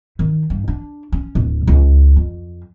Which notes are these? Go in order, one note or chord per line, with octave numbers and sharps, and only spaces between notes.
D#3
G2
D4
C#4
D1
C#2
F2